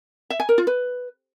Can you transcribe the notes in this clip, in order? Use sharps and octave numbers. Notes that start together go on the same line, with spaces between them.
E5
G#5
A#4
F4
B4